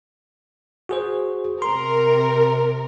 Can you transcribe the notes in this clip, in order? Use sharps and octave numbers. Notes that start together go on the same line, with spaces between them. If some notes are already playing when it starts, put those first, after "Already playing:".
F#4 G#4 C5
C3 A#4 C6